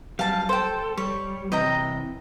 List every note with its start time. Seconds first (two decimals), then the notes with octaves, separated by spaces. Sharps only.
0.19 F#2 G3 F5 A5
0.49 A4 C5 G5
0.98 G3 C#5
1.52 C3 E3 D#5 G5 A#5